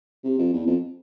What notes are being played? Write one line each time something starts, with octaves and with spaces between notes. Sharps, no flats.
C3
F2
E2
F2